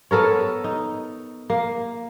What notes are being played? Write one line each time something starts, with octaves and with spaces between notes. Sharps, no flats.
B3 A4 A#4 C#5
D#4
A#3